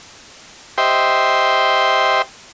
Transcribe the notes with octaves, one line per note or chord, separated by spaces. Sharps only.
G4 C5 D#5 E5 G5 C6